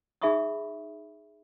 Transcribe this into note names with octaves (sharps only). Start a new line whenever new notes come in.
D#4 G#4 E5 B5 C#6 D#6